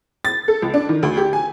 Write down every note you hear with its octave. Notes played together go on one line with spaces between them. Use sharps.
A6
A4
C#2
D4
D#3
D2
G4
G#5